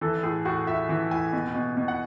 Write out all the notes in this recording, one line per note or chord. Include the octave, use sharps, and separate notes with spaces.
E3 A4
A2 G#4
A2 F#4
A2 E5
E3
A2 G#5
B2
B2
B2
F#5